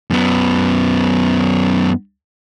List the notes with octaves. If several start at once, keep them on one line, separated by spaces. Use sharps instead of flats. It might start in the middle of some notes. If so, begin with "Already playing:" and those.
F#2 B3